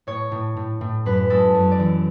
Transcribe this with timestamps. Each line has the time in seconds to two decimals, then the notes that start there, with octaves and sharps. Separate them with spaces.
0.07 A2 C#5
0.32 A2
0.57 A2
0.81 A2
1.06 F#2 B4
1.30 G#3 A4
1.55 F#2
1.71 D5
1.80 E3